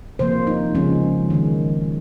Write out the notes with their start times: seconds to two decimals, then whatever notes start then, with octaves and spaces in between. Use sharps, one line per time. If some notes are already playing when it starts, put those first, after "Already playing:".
0.19 C3 F3 A#3 C5
0.47 D#4
0.75 C#3 F3 G#3 C#4
1.30 D#3 G#3